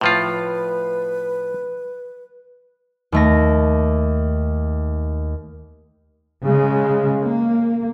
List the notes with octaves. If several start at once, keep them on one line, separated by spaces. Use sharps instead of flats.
A2 F3 F4 B4
D#2 A3 A#6
C#3 G#3
A#3